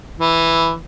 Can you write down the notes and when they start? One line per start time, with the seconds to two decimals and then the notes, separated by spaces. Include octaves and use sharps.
0.20 E3